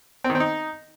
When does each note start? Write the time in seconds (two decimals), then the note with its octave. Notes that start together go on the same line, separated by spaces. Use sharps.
0.24 C4
0.30 D#3
0.35 C4
0.40 D#4